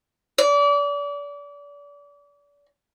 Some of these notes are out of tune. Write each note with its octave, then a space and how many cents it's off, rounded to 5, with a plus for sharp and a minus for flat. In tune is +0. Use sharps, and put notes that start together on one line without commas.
D5 -35